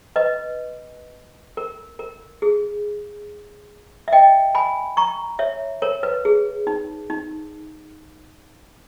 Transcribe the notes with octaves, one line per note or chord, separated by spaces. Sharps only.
B4 D#5
A#4
A#4
G#4
E5
D#5 G5
G#5 B5
A#5 C#6
C#5 E5
A#4 C#5
B4
G#4
D#4
D#4